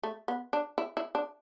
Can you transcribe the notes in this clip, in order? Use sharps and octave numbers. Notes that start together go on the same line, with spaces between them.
A3
B3
D4
E4
E4
D4